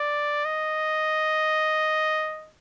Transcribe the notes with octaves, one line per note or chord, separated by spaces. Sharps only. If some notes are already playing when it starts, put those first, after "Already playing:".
Already playing: D5
D#5